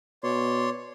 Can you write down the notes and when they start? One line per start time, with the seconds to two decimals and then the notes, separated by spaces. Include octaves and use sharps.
0.24 B2 C#5 D5 C6